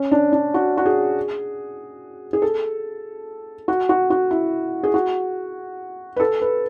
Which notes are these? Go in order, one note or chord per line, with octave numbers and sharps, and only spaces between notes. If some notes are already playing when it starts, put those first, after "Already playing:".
Already playing: C#4
D4
D4
F#4
F#4
G#4
G#4
A4
F#4
F#4
F#4
E4
G#4
F#4
B4
A4
B4